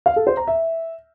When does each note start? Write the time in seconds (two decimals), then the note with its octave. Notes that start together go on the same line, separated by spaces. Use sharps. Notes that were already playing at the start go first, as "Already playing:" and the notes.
0.06 F5
0.16 A4
0.27 C5
0.37 A#5
0.48 E5